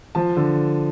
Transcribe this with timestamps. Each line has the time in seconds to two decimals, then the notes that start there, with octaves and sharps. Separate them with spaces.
0.15 F3 A5
0.37 D3